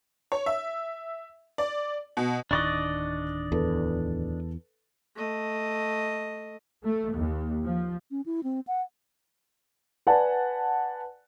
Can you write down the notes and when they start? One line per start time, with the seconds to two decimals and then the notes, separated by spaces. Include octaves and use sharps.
0.32 C#5
0.46 E5
1.58 D5
2.17 B2
2.51 D1 D#3 D4 D5 D#5 C#6 F#6 A6
3.52 E2 A4 B4
5.16 A3 D#5
6.84 A3
7.15 D#2
7.64 F3
8.10 C#4
8.26 E4
8.44 C4
8.67 F#5
10.07 B4 D5 F#5 G#5 A5